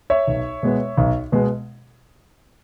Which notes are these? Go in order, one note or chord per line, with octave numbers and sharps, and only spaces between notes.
C#5 E5
B1
B2 G#3 B3
B1
B2 G#3 B3